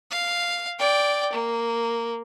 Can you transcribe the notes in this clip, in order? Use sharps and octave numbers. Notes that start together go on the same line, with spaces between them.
F5
D5 G5
A#3